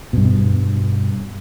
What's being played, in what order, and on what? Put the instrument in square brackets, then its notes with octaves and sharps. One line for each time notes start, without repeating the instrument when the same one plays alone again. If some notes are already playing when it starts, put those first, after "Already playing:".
[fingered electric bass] G2 B2